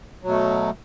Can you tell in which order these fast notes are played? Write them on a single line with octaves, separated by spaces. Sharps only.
F#3 B2 A3